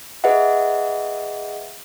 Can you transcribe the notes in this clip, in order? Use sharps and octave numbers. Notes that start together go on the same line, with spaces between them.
G#4 B4 D#5 E5 F#5